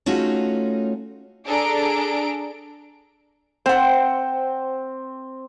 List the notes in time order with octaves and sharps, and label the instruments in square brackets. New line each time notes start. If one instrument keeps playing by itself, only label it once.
[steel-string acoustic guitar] A3 C#4 D#4 F4 F#4 G#4
[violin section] D4 G#4 A4 A#5 D7
[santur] C4 [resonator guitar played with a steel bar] C5 F#5